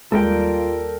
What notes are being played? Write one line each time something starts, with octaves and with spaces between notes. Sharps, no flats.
D#2 G3 G#3 A#3 F4 A4 A#4 G5